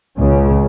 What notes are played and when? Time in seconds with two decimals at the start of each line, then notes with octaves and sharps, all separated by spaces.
0.19 C#2 C#3